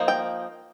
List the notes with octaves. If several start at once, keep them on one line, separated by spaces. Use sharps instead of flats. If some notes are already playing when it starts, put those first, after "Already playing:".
Already playing: F3 A#3 D#4
G5